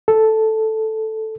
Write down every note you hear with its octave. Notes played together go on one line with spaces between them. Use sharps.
A4